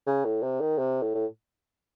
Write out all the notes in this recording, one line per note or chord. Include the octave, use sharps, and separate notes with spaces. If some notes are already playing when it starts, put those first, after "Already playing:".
C#3
A2
C3
D#3
C3
A2
A2